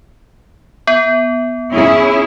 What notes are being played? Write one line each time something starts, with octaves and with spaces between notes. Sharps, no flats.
B3
C#4 E4 G#4